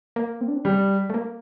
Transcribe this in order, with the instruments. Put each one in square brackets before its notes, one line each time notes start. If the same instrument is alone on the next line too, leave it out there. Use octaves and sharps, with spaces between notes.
[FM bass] A#3
C4
D4
C4
[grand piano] G3
[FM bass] A3
A#3